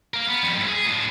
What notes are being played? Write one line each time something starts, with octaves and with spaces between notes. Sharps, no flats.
A#4 F5
B3
F2 G3
G#2 E4
G#4
A2 D4